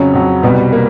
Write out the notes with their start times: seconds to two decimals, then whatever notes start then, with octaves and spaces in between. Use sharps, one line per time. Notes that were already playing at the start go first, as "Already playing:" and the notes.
Already playing: F2 C#3 F#3 C#4
0.13 F2 C#3 F#3
0.43 C2 B2 G3 B3
0.73 A#3